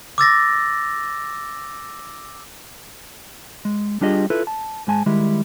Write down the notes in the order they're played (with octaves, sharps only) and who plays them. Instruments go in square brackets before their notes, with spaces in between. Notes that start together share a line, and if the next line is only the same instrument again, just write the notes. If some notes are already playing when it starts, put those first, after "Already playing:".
[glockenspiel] D6 E6 A6 A#6
[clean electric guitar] G#3
G3 D4 F4 G4 G#4 D#5
E4 F4 A4 B4
A5
G#2 G#3 G#5 A5
D#3 G3 G#3 E4